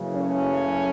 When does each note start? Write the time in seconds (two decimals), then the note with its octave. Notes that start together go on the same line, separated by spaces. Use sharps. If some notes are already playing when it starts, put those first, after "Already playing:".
Already playing: F#1 F#2 C#3 E3
0.13 A3 C#4